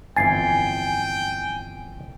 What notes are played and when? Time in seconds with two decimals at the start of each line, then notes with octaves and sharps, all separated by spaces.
0.16 G1 F2 E3 G5 G#5 A6 C7